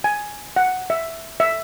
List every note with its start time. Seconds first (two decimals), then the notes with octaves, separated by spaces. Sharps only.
0.04 G#5
0.56 F#5
0.90 E5
1.40 E5